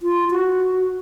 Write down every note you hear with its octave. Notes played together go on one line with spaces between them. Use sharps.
F4
F#4